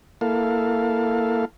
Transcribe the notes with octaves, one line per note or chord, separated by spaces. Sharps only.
A#3 E4 A4 F5